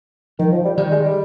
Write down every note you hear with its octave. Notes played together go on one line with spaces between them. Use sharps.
D#3 F3
F3
G3
D#3 G3
G#3
G3